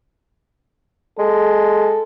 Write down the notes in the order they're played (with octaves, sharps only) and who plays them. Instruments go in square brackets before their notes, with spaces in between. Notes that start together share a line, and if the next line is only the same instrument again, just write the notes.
[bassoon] G#3 [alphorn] A4